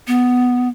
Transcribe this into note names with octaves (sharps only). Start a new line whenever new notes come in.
B3